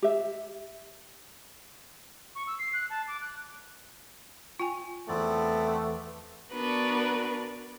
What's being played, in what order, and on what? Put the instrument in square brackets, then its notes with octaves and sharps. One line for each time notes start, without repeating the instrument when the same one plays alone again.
[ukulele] G4 E5
[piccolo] C#6
E6
C7
F#6
A5
D6
F#6
[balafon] F4 G5 G#5
[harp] E2 [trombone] A3 [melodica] B3 C4 D5
[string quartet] B3 D4 F#4 A#4 B4